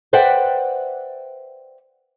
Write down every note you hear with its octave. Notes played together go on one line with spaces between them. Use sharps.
B4 C5 D5 E5 F#5 G5